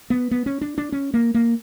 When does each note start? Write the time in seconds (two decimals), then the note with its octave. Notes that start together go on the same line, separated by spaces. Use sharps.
0.10 B3
0.31 B3
0.46 C#4
0.61 D4
0.78 D4
0.92 C#4
1.14 A#3
1.34 A#3